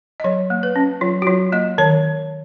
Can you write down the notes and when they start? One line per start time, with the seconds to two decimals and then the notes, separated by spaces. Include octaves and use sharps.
0.20 D#5
0.24 F#3 C#5
0.50 A#3
0.63 B4
0.76 C#4
1.01 F#3 F4
1.22 F#4
1.27 F#3 F4
1.52 A#3 D#5
1.78 D#3 C#5